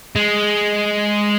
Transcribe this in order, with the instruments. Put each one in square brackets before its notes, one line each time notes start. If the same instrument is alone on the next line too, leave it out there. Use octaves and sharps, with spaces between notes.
[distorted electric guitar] G#3